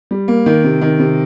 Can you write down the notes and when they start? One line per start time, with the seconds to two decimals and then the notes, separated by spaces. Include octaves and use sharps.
0.11 G3
0.28 A#3
0.46 D#3
0.64 C3
0.82 D#3
0.99 C3